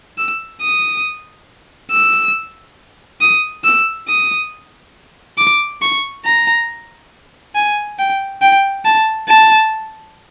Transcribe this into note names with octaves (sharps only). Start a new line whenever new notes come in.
E6
D#6
E6
D#6
E6
D#6
D6
C#6
A#5
G#5
G5
G5
A5
A5